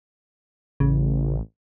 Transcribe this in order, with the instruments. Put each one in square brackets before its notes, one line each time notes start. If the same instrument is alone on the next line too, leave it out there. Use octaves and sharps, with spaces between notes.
[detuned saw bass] A1 [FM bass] C#3